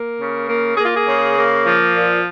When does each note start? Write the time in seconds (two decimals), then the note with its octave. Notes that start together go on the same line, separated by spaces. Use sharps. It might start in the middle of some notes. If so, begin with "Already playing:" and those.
Already playing: A#3
0.17 C#3
0.47 A#3
0.76 A#3 G#4
0.85 F4
0.94 G#4
1.06 C#3
1.35 A#3
1.65 F3
1.94 A#2